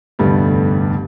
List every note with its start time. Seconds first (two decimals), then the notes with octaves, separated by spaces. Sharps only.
0.19 F1 D2 G2 G3 A3 B3